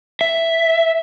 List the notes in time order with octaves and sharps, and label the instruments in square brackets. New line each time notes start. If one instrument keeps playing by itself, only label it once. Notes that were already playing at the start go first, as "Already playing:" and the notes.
[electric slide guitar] E5